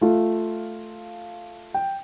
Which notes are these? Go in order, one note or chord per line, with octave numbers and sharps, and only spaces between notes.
A3 F4
G5